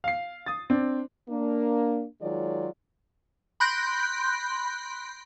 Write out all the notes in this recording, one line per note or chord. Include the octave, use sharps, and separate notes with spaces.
F5 C7
D#6 A6
C4 D4
A#3 D4
D#3 F#3 G#3 F4 C#5 D5
B5 C6 F#6 G6 A#6 D7